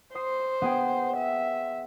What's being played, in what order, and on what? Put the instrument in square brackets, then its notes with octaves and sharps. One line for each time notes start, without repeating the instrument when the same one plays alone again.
[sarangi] C5 [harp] C6 D#6 C7
[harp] B3 G#4 G5
[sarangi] E5